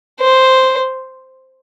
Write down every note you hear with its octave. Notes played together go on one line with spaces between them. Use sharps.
C5